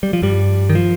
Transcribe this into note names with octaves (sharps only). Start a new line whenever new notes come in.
G3
F3
G2 G3
D#3
F3